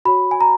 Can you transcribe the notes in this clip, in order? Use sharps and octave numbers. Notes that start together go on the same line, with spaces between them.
F#4 C#5 B5
G#5
A#5